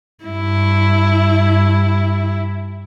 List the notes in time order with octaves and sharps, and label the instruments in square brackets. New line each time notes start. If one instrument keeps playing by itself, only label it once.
[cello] G2 E4